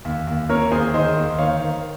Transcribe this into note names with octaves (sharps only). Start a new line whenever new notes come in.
D#2
D#2
A#3 A#4 C#5
D#2 G#4 C5
D#3 C5 D#5
D#2
D#3 C#5 F5
D#3